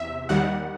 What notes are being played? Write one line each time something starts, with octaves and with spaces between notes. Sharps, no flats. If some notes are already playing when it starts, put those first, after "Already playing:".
Already playing: E2 C3 E5
D#2 D#3 G3 F#5